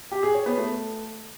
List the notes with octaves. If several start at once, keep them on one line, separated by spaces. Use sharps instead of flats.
G4
G#4
C#5
B3
A3